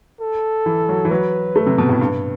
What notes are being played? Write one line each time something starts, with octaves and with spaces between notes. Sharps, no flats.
A4
E3
F#3
E3
F#3 B4
A3
C3
B2
A2
G2